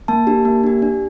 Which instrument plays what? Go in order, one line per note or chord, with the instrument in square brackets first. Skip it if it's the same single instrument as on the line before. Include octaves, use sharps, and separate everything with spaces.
[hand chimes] A#3 A5
D4 G4
A#3
D4 G4
D4